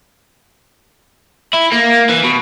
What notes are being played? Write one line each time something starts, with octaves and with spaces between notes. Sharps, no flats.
E4
A#3
E3
B2